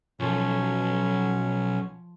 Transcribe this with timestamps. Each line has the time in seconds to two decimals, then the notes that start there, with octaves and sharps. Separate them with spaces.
0.20 B1 F3 C#4 A4